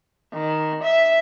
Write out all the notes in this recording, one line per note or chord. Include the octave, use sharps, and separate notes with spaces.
D#3
E5